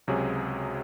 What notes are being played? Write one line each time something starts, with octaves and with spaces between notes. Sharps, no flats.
C#2 C3 F#3 C#4 G#4